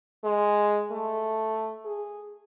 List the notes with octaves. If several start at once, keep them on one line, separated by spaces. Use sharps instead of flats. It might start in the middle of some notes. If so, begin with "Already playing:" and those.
G#3
A3
G#4